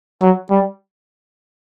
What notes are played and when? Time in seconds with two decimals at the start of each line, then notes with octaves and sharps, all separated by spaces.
0.22 F#3
0.51 G3